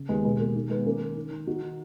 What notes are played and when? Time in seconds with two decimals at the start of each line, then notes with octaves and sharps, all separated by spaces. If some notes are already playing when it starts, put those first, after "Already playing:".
Already playing: C#3
0.09 D#2 G#3 B3
0.24 B2 G#3 B3
0.39 B2 A#3
0.56 D#3
0.70 D#3 G#3 B3
0.86 D#3 A#3 C#4
1.01 D#3
1.16 D#3
1.31 D#3
1.46 D#3 D#4 F#4
1.62 D#3